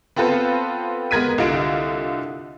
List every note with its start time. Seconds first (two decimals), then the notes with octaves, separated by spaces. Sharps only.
0.16 B3 C4 F4 A4 B4 C5
1.11 G#3 B3 A#4 G#6 B6 D#7
1.38 C2 D3 F4 D#5 D7